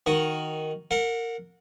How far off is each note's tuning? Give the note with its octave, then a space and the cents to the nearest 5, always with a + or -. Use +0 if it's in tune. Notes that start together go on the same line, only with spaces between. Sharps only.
D#3 +0 F#4 +0
A#4 -20 F#5 -30